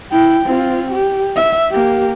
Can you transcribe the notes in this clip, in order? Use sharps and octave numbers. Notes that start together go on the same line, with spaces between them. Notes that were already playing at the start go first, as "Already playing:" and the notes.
E4 G5
C4 F4
G4
E5
A#3 G4